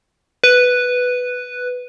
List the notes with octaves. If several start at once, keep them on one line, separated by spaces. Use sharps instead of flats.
B4